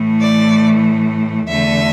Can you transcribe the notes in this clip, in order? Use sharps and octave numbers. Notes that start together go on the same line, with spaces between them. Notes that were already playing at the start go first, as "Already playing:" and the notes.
Already playing: A2 E3 A3
D5
E2 D3 A3 E5